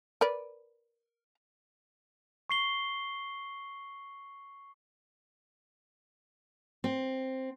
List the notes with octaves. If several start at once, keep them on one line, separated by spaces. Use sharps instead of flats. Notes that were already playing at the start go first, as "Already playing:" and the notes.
A#4 B4 D5
C#6 C7 G7
C4